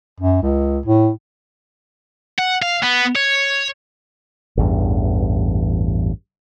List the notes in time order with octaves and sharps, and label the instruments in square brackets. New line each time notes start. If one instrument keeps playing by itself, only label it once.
[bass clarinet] F#2
C#2
A2
[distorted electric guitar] F#5
F5
B3
C#5
[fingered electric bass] A1 E2 G2